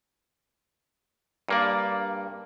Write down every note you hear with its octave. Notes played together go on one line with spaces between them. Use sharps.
G2 A#3 D5